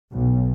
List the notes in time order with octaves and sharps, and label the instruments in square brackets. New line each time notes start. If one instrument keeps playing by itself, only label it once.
[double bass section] B1